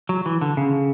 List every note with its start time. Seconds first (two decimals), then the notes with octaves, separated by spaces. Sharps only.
0.09 F#3
0.26 E3
0.41 D3
0.57 C#3